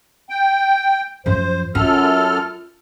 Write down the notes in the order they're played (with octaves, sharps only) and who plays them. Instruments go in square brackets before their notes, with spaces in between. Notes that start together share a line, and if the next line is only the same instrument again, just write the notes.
[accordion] G5
[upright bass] F#2 F3 [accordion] C5
[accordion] F#2 A4 F6 [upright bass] F4